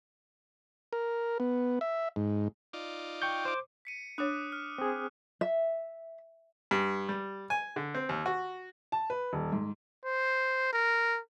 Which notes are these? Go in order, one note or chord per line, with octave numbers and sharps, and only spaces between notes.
A#4
B3
E5
G#2
D#4 F4 D5
G5 C#6 G6
C5 D6
B6 C#7 D#7
D4 C#5 D6 D#6 F#6
F6
C4 G#4
E5
G2
G3
G#5
D3
C4
D#2
F#4
A5
B4
D#1
G#2
C5
A#4